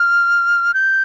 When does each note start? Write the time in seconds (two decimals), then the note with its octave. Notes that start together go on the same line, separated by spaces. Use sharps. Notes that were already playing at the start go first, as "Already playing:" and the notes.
Already playing: F6
0.74 G6